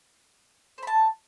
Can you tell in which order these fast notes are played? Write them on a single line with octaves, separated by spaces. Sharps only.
C5 B5 A5